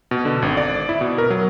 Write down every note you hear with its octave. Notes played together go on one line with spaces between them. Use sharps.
B2
D3
G#1
D5
E4
B2
A#4
F#3